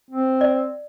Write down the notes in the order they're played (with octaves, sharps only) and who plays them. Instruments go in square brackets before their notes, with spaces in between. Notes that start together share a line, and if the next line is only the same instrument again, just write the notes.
[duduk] C4
[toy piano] D5